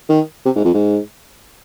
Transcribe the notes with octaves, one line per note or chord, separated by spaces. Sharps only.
D#3
C3
G#2
F2
G#2